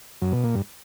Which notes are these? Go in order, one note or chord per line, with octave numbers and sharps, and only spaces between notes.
F#2
B2
A#2
G2